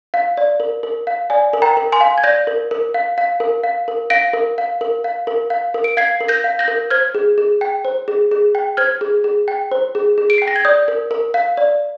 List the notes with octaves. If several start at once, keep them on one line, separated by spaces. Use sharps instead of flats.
F5
D5
A#4
A#4
F5
D5 G#5
A#4
G5 A#5
A#4
G#5 C6
F5
G#6
D5 G6 A#6
A#4
A#4
F5
F5
A#4
F5
A#4
F5 A#6 D7
A#4
F5
A#4
F5
A#4
F5
A#4
D7
F5 G#6 C7
A#4
G6 A#6
F5
G6 A#6
A#4
C5 F6 G#6
G#4
G#4
G5
C5
G#4
G#4
G5
C5 F6 G#6
G#4
G#4
G5
C5
G#4
G#4
D7
G5 C7
A#6
G#6
D5 D#6 G6
A#4
A#4
F5
D5